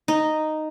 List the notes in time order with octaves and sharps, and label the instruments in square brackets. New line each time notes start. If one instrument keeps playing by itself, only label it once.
[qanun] D#4